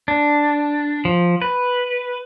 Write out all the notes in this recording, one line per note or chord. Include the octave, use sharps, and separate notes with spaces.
D4
F3
B4